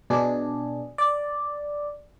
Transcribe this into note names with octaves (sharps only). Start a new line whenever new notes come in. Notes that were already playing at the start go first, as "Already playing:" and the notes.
B2 D4 G#4
D5